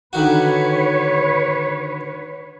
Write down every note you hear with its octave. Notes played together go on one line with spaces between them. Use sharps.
D3 D#3 F#4 B4 C#5